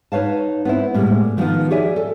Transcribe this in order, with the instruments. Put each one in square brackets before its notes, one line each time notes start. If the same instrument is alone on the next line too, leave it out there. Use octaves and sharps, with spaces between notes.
[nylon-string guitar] D#4 B4 C#5 F5 A5
B3 C4 E4
A2 C3 G3 G#3 A#3
D#3 F3 A3 B3 D#4 F4
G4 G#4 C#5 D5 E5 G#5
A4